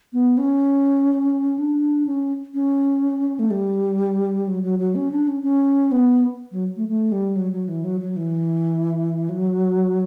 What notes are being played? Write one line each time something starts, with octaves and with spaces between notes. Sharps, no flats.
B3
C#4
D4
C#4
C#4
A3
G3
F#3
F#3
F#3
C#4
D4
C#4
C#4
B3
F#3
A3
A3
G3
F#3
F#3
E3
F#3
F#3
E3
F#3